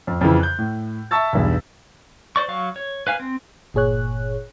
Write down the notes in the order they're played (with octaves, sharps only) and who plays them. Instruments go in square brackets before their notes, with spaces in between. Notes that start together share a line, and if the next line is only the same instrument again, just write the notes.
[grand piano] F2
F2 C#3 E3
F#6 G6
A2
E5 A5 C#6 E6 A6
B1 E2 G2
[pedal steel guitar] C5 D5 C#6
F#3 F5 C#6
C#5
B4 F5 G#5
C4
[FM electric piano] G1 A#2 G#4 C#5 F#6